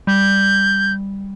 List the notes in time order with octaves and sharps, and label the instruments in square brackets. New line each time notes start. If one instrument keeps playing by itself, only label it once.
[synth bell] G3 [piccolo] G6